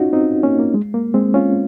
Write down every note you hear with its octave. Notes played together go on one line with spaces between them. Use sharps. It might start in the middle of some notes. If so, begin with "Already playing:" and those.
Already playing: C#4 D#4 F4 F#4
C4 D#4
A#3 C#4
A#3
G#3
A#3
G#3 C4
C#4 F4